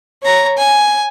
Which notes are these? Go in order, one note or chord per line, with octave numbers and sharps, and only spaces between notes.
C#5 A#5
G#5